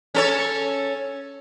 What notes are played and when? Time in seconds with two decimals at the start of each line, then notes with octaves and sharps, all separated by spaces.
0.14 C#4 A4 C#5